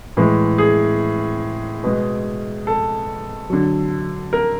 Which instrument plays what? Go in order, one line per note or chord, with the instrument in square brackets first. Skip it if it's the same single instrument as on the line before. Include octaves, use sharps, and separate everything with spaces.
[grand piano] A2 E3 G#3
G#4
B2 G#3
A4
D3 F#3
A#4